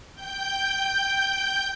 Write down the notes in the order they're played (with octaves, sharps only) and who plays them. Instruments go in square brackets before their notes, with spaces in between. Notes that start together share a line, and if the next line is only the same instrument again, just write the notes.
[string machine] G5 G6